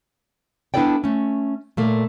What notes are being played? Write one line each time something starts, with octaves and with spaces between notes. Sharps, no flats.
B3 D4 E4 A4 D5 G5
A3 C#4
A#2 A3 A#3